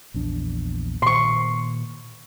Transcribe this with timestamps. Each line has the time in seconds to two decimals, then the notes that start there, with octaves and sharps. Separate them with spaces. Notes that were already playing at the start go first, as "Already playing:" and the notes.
0.14 A#1 E2 D4
1.02 A#2 D#3 C6 C#6